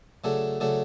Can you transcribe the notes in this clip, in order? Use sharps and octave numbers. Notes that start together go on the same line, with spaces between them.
C#3 F#3 A3 D4 A4
C#3 F#3 A3 D4 A4